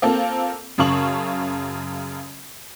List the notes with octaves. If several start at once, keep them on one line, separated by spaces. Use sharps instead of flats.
A#3 C4 F4 A4
F#2 C#3 F5 A5 C#6 F#7